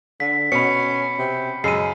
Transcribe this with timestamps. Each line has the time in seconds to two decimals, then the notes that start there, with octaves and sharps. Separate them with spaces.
0.20 D3 B6
0.52 B2 C#4 B5 C#7
1.19 C3
1.64 F#2 C#3 G#3 C7 D#7